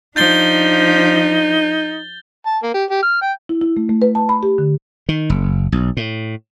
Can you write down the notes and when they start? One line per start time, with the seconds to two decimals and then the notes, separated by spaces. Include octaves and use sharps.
0.16 F3 D4 D#4 G6 A6 G7
2.46 A5
2.63 A#3
2.74 G4
2.90 G4
3.03 F6
3.22 G5
3.49 E4
3.61 E4
3.77 A3
3.89 A3
4.02 B4
4.15 A5
4.29 B5
4.43 G4
4.58 D3
5.09 D#3
5.30 F#1
5.72 B1
5.97 A2